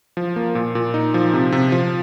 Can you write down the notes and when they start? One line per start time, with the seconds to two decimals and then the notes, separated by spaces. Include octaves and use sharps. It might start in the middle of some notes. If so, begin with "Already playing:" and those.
0.17 F3
0.36 A#3
0.55 A#2
0.75 A#2
0.94 D#4
1.14 F3
1.33 C3
1.52 C3
1.72 F3